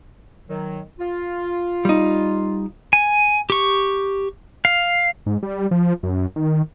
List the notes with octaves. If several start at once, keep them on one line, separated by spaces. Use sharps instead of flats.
D#3 F#3
F4
G3 D#4
G#5
G4 C#6
F5
G#2
G3
F3
F#2
D#3